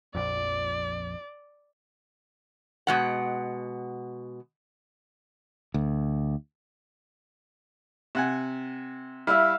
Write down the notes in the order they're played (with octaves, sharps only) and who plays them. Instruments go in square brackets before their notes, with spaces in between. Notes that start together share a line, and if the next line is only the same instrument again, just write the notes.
[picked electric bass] A#1 F2 [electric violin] D5
[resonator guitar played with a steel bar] B2 G#3 F#5
[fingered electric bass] D2
[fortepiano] C3 F#5 G#5
[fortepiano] G3 E4 [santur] E5 F5